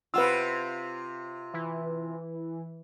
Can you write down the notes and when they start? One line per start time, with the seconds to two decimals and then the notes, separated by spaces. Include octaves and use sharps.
0.14 C3 F4 B4 F#5 E6
1.53 E3